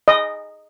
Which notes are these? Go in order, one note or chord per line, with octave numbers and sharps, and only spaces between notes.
D#5